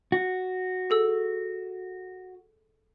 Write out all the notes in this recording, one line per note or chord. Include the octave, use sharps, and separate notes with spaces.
F#4
G#4 A4 E6